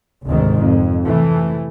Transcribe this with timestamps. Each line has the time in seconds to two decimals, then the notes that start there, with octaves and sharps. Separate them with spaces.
0.24 F1 D2 G#2 D#3
0.60 F2
1.04 C3 E3 A3